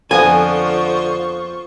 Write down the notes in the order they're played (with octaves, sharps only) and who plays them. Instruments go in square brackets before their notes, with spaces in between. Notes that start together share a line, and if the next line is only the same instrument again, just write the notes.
[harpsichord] F2 F3 B3 [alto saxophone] D3 [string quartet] F4 C5 C#6 [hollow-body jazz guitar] G#5